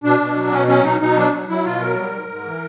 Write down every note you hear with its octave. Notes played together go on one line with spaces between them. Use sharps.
B2 D4
B2
F#3
B2 C#4
F#3 C#4
B2 D#4
B2 D#4
F#3 D4
F#3
F#3 E4
B2 F4
F#3 A#4
G3
G#2
G#2
E3